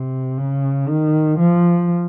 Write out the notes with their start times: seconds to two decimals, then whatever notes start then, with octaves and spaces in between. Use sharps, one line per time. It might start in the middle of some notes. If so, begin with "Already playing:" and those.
Already playing: C3
0.38 C#3
0.88 D#3
1.39 F3